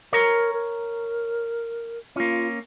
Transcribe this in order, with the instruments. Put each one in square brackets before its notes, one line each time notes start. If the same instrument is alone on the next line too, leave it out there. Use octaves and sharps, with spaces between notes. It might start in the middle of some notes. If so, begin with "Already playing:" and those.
[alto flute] A#4 [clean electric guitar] C#5 A#5
[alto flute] A#4
[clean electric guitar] A#3 C#4 [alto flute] F4